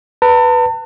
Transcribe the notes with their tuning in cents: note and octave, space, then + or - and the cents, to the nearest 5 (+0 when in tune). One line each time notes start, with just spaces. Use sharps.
B4 +0 A5 +45